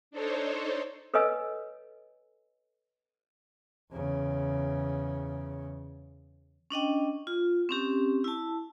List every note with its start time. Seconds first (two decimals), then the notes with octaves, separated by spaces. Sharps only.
0.11 D4 D#4 A4 C5 C#5
1.14 A4 B4 C#5 D#5 G#5 E6
3.93 E2 C#3
6.70 C#4 D4 D#5 G5
7.27 F4
7.69 C4 C#4 G4
8.24 E4 A5